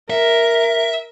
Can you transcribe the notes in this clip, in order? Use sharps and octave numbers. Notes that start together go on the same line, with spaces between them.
A#4 E5